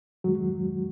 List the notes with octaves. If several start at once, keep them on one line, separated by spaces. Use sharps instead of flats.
F2 D#3 F#3 G#3 F#4